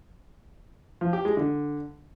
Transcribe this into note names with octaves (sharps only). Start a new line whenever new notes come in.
F3
G4
G#3
D3